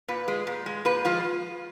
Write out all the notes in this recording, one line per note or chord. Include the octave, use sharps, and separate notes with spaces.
A#2 B4
G#3
A#2
G#3
A#2 B4
F3 G#3 F4